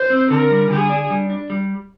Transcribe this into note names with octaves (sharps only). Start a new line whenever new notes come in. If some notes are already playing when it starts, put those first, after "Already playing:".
Already playing: C5
C4
D3 A#4
G3
D3 G#4
D4
G3
D4
G3